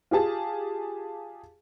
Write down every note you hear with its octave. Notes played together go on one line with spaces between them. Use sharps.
F4 G4 G#4 A5